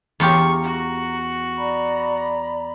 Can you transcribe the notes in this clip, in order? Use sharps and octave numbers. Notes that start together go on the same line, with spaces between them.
E2 F4 G4 A#5 C#6
F#4
D5 A#5 B5